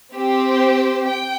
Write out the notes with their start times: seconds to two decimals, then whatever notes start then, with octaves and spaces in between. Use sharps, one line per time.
0.15 C4 G4 C5
1.08 G5